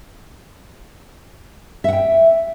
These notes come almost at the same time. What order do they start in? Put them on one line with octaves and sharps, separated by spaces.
E5 F#5 G5